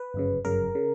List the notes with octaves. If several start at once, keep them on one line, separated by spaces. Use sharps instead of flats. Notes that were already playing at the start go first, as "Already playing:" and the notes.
Already playing: B4
G1 F#2 C#3
G1 F#2 C#3 A#4
C#3